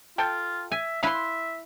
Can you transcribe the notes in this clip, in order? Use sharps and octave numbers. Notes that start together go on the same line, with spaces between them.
F4 A4 G5
E5 G#5
E4 B4 E5 F5 B5 C6